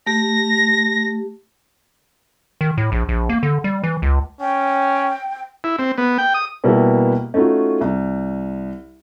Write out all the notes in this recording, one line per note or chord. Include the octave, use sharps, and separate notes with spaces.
A3 G4 A#6
D#3
A2
A#1
A#1
A#3
D3
G3
E3
C#2
C#4 G5
E4
C4
B3
G5
D#6
B2 G3 A#3 B3 E4 G4
A3 C#4 D#4 F4 F#4
C2